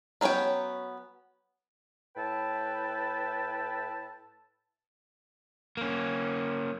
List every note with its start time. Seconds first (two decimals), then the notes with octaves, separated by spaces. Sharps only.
0.21 F#3 B3 C#4 C#5 G5
2.16 A2 E4 B4 G5 A5
5.77 A#3 C#4